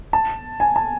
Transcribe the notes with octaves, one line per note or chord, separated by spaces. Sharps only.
A5
G#5
A5